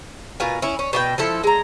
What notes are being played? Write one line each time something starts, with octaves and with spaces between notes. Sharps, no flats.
B2 F4 A#4 G#5
C#4 E4
C#4
B2 G4 G5
F3 E4 A4
G#3 A#5